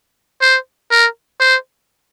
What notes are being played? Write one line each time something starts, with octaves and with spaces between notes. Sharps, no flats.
C5
A#4
C5